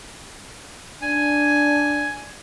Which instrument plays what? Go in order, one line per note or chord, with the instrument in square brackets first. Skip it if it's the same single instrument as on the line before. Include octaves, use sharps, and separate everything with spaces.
[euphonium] D4 [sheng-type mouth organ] G#5